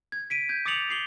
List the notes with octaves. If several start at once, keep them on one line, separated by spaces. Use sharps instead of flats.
G#6
B6 D7 D#7
G6 G#6
D6 D#6 A6 C#7 F7 F#7
D6 C7 F#7 G7